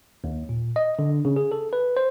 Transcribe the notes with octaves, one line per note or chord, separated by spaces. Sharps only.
D#2
A#2
D#5
D3
C#3
G#4
A4
B4
C5